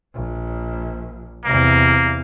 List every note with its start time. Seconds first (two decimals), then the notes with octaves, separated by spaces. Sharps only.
0.14 A#1
1.45 E2 C3 A#3